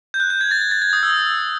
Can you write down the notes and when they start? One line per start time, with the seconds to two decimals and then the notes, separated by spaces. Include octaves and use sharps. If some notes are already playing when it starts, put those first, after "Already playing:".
0.14 G6
0.20 F#6
0.30 G6
0.41 G#6
0.51 A6
0.61 G#6
0.71 A6
0.82 G#6
0.93 D#6
1.03 E6